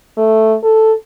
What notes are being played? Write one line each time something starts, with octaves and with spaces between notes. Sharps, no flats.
A3
A4